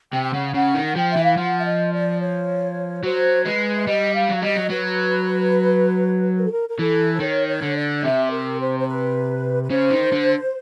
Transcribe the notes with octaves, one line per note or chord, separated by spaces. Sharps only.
C3 G5
G5
C#3 F#5
C#3 F#5
D#3
F3 G5
E3 E5
F5
F3 F#5
E5
D#5
D5
C#5
F#3 C5
G#3 B4
E5
G3 D#5
F5
F#3
G3 D#5
F#3
F#3 B4
A#4
A4
A#4
A#4
E3 A4
C5
D#3 C#5
C#5
D3
D5
C3 E5
A#4
C5
C5
B4
B4
C#3 C5
D#3
D3